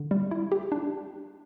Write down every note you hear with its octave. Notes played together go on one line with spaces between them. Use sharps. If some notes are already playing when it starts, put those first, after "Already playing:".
Already playing: D3
G3
E4
G4
D4